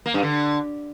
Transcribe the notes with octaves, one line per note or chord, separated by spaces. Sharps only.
A#3
G2
D3